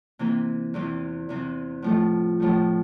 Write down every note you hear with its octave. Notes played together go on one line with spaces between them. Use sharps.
C3 E3 A#3
E2 C3 E3
E2 C3 E3
A2 F3 A3
A2 F3 A3